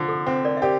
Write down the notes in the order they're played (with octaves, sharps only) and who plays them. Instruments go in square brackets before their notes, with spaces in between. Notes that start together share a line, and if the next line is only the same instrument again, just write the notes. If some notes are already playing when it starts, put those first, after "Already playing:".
Already playing: [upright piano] D3 F3
[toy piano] A4
[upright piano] C4 [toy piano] C5
[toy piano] A#4 D5
E5
[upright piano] G4 [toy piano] A#4 D5